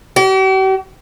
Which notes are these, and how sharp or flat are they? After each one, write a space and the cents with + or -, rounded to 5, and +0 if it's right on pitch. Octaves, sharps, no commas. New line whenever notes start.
G4 -45